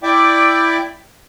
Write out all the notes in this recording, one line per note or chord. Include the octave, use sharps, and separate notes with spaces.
E4 D5 E5 G5 D6